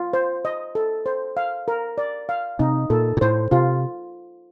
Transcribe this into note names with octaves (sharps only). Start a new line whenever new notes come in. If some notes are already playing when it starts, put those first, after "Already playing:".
Already playing: F4
C5
D#5
A4
C5
F5
A#4
D5
F5
C3 D#4
A#2 A4
A#2
A2 C5
C3 F4